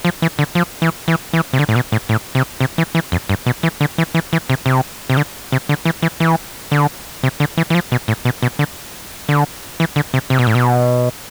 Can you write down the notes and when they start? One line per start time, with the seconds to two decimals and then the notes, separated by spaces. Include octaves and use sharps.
0.05 F3
0.22 E3
0.39 D3
0.55 F3
0.82 E3
1.08 E3
1.33 E3
1.53 C3
1.59 D3
1.69 A2
1.76 B2
1.92 A2
2.09 A2
2.35 C3
2.60 C3
2.78 E3
2.95 E3
3.12 F2
3.29 G2
3.46 B2
3.63 E3
3.81 D3
3.98 E3
4.14 E3
4.33 E3
4.50 C3
4.66 C3
5.10 C3
5.17 D3
5.52 C3
5.69 D3
5.85 E3
6.02 E3
6.20 E3
6.72 D3
7.23 C3
7.40 D3
7.57 E3
7.70 E3
7.75 F3
7.92 B2
8.08 A2
8.25 B2
8.42 B2
8.59 D3
9.29 D3
9.80 E3
9.96 D3
10.14 C3
10.30 C3
10.39 B2
10.47 A2
10.55 B2